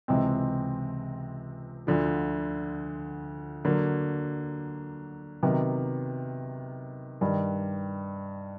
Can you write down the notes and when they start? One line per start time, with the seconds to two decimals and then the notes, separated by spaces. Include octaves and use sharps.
0.08 C#2 C3 E3 G#3 C4
1.87 D2 D3 F3
3.65 D3 F#3 A#3
5.43 C3 D#3 F#3 B3
7.21 G2 D#3 G3